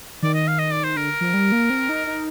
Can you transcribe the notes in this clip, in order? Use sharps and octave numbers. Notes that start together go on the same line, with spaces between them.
D#3 D5
D#5
F5
D#5
D5
C5
D3 A#4
F3
G3
A#3
C4
D#4
D#4